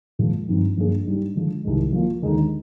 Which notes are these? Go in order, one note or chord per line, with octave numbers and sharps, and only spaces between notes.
A#2 F3 G#3
G2 F3 C4 D#4
G2 F3 A#3 D4 G#4
G#2 G3 D4
D3 F3 G#3
C2 C3 D#3 G#3 D#4
F3 A#3 F4
D#2 D3 G#3 D#4